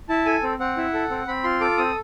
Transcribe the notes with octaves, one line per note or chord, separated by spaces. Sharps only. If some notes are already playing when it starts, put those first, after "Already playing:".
E4 A5
A4 G#5
C4
C4 F#5
E4
A4
C4
C4 B5
F4 C6
A4 D6
C4 D#6